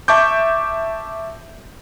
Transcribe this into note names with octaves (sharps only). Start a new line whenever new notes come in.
E5 A5 C#6 D6 G6